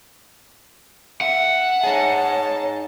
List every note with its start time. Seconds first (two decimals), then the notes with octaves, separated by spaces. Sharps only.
1.21 E5 F#5
1.84 D#4 G#4 C#5 A5